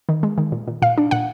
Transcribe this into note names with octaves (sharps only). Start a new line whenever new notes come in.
D#3
G#3
D#3
A#2
A#2
A#2 F5
D4
A#2 F#5